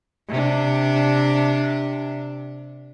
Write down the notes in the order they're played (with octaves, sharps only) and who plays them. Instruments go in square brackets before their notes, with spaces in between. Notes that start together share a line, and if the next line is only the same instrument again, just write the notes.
[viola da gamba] C3 D4